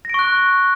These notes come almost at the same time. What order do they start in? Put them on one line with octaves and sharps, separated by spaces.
A#6 D7 C#6 F#6